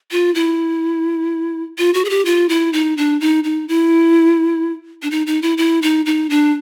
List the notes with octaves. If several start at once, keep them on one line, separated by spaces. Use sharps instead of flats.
F4
E4
F4
F#4
G#4
G4
F4
E4
D#4
D4
D#4
D#4
E4
D4
D#4
D#4
E4
E4
D#4
D#4
D4